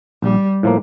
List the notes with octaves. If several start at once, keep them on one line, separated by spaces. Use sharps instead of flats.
A#1 G3
A2 F3 A#3